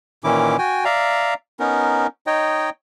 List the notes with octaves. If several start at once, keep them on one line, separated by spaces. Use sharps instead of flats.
A#2 D#3 E3 C#4 E4 D6
F#4 G5 G#5
D5 E5 F5 A#5
B3 C#4 D#4 A#4
D#4 C#5 D#5 G5